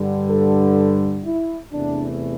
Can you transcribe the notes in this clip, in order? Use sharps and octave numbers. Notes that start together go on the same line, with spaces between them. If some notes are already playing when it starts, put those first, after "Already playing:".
Already playing: G2 D3 G3
A4
E4
E2 C3 E3 A3 D4